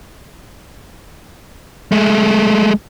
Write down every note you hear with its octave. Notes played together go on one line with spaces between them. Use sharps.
G#3 A3